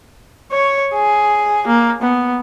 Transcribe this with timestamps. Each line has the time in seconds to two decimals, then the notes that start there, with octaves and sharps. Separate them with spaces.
0.52 C#5
0.94 G#4
1.67 A#3
2.02 B3